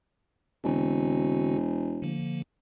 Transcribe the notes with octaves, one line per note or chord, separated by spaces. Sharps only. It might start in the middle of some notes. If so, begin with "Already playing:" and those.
E1 D3 C4 F#4
D3 F3 A#3